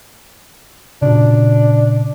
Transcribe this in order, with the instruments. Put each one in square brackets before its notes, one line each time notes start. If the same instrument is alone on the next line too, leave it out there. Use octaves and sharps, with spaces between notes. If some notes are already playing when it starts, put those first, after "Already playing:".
[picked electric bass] A#2 C#3 [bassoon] D4